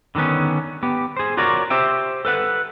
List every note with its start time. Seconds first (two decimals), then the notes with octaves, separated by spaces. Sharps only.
0.15 D3 D#3 F#3 B3 C#4
0.83 B3 G4
1.17 G#4 C5
1.37 F4 F#4 A#4 C#5 D5
1.70 G4 C5 E5 G5
2.25 A4 B4 F#5